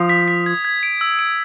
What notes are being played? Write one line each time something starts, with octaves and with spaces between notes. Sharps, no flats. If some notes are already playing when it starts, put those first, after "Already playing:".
Already playing: F3 D#6
B6
B6
G#6
G#6
D7
E6
D7